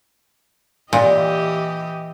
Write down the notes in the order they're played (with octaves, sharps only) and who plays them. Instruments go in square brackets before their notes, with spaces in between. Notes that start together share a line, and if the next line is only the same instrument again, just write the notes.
[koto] A#2 [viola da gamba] E3 G4 D#5